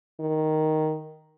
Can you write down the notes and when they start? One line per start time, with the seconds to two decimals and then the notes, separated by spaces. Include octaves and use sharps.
0.20 D#3